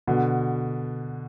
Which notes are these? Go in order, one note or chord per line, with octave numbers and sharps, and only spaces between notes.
B2 D3